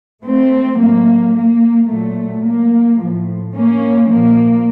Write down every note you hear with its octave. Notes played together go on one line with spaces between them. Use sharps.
A3 C4
A2 F#3 A#3
A#3
A#2 F#3 A3
A#3
A2 F3
A#3 C#4
A#2 F3 A#3